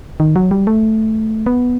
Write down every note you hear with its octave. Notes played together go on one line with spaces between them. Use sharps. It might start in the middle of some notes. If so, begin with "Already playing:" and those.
D#3
F#3
G3
A3
B3